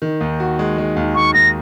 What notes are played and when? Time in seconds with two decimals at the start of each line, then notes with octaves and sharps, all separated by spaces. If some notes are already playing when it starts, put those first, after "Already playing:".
0.02 D#3
0.21 D#2
0.40 F#4
0.59 G#3
0.78 G#3
0.96 D#2
1.15 D#2 C#6
1.34 D#2 A#6